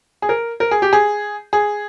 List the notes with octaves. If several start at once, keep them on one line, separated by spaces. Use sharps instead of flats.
G#4
A#4
A#4
G#4
G4
G#4
G#4